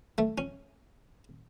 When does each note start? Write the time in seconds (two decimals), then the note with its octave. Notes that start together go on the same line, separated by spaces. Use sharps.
0.18 A3
0.38 C#4